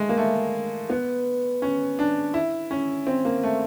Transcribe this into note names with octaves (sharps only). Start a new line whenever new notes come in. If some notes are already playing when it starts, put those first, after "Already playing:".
Already playing: G#3 A3
A#3
A3
B3
C#4
D4
E4
C#4
C4
A#3
A3